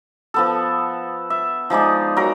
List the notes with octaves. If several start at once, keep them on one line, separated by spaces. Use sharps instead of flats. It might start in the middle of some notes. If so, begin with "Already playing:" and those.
F3 B3 A4
E5
F3 G#3 D#4 D5
F#3 A#4